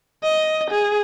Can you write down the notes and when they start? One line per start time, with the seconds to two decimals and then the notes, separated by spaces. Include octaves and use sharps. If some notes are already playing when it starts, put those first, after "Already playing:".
0.23 D#5
0.71 G#4